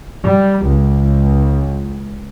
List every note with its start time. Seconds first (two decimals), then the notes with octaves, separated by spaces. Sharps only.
0.24 G3
0.65 C#2